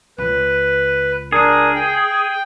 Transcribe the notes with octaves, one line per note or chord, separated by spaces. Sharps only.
C#2 B4
D4 G#4 A#4
G5